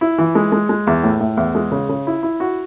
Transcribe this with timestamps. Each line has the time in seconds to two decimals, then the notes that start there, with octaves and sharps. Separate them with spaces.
0.01 E4
0.18 E3
0.35 G#3
0.52 G#3
0.69 G#3
0.87 E2
1.04 A2
1.21 A2
1.37 E2
1.55 G#3
1.72 C#3
1.89 C#3
2.07 E4
2.23 E4
2.40 F#4